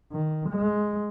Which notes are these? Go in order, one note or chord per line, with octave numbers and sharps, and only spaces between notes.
D#3
G#3